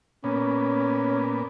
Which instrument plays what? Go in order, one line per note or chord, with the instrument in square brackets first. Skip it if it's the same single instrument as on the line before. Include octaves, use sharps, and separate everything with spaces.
[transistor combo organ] A#2 B3 [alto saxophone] C#4